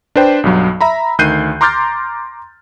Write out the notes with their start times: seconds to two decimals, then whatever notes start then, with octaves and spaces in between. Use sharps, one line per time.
0.16 D4 B4 C5 G5
0.44 B1 G2 F#3
0.81 E5 A#5 B5
1.18 D2 D#3 F#6 G6 C7 D#7
1.61 A#5 C6 D6 F6 G6 A6